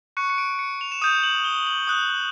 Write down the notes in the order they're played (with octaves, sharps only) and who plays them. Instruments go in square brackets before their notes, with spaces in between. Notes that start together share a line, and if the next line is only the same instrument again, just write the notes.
[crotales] C#6 F#6 C#7
C#7
D7
C#7
F7
E7
D#6 G6 D#7
F#7
G7
F#7
D#6 F#6